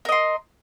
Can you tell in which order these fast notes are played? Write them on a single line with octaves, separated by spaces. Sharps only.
A#4 D#5 C6